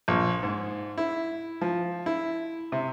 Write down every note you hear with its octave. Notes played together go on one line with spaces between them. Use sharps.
A#1
G#2
E4
F3
E4
C3